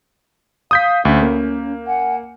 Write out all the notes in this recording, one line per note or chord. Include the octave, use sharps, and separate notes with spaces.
F5 D#6 G6 B6
D2 C#4
A#3
F#5 G#5